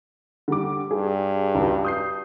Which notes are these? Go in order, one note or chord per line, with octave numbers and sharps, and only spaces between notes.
D3 G3 D6
G2 G#4
C#2 F#4
D#6 G6 C7